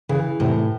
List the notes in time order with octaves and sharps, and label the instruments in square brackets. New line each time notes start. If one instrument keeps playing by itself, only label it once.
[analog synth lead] C#3 [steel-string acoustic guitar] E3
[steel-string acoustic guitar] A2 [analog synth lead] C3